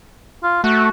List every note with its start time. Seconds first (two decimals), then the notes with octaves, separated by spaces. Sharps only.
0.43 F4
0.64 A3 F#4